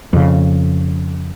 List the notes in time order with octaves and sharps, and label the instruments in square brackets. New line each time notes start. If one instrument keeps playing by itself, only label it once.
[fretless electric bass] F2 C#3